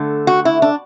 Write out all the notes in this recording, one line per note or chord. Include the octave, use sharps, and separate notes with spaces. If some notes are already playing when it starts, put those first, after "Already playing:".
Already playing: D3 A3
F#4
E4
D4